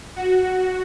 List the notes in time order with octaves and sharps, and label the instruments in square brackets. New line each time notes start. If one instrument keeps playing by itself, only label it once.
[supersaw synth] F#4